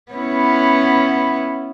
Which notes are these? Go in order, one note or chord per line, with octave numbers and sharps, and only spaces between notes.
B3 C#4 E4